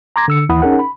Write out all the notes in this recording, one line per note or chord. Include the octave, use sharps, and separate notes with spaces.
A#5 C6 D6 G#6 A#6
D3 E6 C#7
D#2 E3 E4 F#5 B5 D#6
C#4 D#4 G#4 A#4 F#5
B5